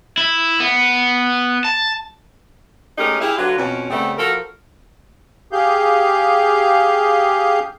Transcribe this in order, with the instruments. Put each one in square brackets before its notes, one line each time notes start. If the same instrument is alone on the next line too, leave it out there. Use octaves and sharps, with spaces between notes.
[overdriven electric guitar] E4
B3
A5
[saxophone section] G#3 A3 C#4 D#4 G4 A#4
E4 G4 G#4 E5 F5
D3 F#3 D4 F4 F#4 B4
F2 B2 C#4
C#3 G3 A3 B3 C4
F3 F#4 A4 A#4
[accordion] G4 G#4 F5 G6